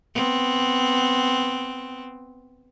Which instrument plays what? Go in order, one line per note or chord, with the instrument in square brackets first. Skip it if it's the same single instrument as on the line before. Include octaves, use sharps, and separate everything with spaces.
[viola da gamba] B3 C4